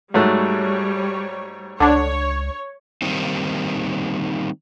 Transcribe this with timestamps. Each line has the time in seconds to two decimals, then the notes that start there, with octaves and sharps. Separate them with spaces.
0.14 G#2 F#3 G3 A3 C#5
1.80 C#2 D3 D4 C#5
3.02 D#3 G3 A#3 C4 D#4